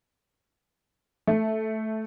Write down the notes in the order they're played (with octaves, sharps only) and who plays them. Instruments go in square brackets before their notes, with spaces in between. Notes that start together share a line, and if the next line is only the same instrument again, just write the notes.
[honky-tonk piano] A3